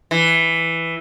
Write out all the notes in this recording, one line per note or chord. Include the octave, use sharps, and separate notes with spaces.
E3